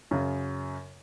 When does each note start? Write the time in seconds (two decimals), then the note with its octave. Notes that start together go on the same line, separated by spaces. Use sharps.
0.11 F#2 C#3